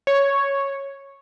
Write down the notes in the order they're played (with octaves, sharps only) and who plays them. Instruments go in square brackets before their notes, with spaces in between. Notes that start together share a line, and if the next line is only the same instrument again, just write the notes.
[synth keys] C#5